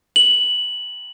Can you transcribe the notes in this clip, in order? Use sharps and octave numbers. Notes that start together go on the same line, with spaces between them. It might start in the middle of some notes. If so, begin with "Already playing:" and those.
F#7